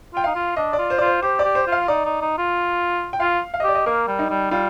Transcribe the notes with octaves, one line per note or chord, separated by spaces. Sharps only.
F4 G5
D#4 F5
F4
D4 D#5
D5
F4
C5
F4 D5
C5
G4 C5
D5
G4
C5
F4
F5
D#4 D5
D#4
D#4
F4
G5
F4 F5
F5
D#5
G4 D5
D#5
A#3 A#4
G3
D#4
G3
G3 F4